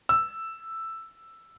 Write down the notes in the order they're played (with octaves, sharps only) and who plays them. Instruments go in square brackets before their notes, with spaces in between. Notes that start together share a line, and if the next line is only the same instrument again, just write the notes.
[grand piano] E6